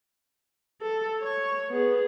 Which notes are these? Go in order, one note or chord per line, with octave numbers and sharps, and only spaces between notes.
A4
C#5 C#6
B3 G#4